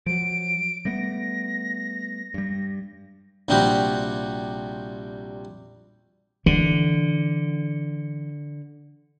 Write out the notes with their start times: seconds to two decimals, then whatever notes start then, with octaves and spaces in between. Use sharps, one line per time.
0.06 F3 F#3 D7
0.85 G3 A3 B3 A#6
2.34 G2 G3
3.48 A#1 C3 G3 C4 F#4 G4
6.46 D3 E3